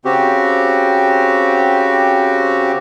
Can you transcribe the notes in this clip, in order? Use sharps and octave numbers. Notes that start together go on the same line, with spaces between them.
C#3 C4 F#4 G4